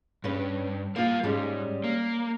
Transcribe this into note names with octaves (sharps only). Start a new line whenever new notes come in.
G2 C#4 B4
G3 A#3 F4 F5
G#2 G3 G#3 C#4
A#3